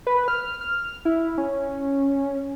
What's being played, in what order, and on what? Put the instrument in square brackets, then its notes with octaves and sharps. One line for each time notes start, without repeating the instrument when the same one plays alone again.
[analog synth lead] B4
F6
F6
E4
C#4